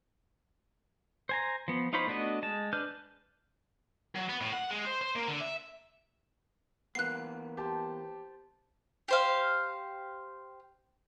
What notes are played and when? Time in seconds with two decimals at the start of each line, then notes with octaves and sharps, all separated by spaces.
1.29 C5 G#5 A#5
1.68 F3 B3
1.93 D#4 F4 C5 C#5 B5
2.07 A3 B3 D4 F#4 D#5
2.43 G#3 A5
2.73 D4 B4 F6 G6
4.15 F#3
4.29 B3
4.41 A2
4.53 F#5
4.71 G#3
4.85 C5
5.01 C5
5.16 A#3
5.28 D3
5.41 E5
6.95 E3 A#3 B3 F#6 C7
7.57 G4 C5 A5 C6
9.08 G4 C5 F5